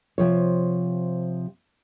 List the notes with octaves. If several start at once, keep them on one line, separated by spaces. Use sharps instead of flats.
C3 F3 C#5